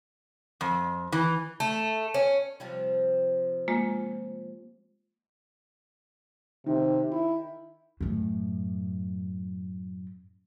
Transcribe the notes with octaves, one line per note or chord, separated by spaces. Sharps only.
F2
E3
A3
C#4
C3 F3 G3
G#3 A#3 F4
C3 D#3
E4
F#2 A2